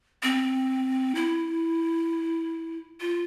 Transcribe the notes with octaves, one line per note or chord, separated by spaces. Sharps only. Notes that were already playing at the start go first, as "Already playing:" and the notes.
C4
E4
F4